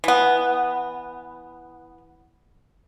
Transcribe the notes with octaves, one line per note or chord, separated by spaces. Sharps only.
E3 B3